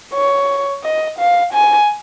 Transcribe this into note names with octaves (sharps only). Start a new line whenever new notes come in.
C#5
D#5
F5
G#5